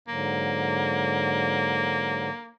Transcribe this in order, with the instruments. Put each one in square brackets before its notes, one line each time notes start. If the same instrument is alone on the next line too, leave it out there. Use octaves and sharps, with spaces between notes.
[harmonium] G#2 D3 F#3 [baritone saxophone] A#3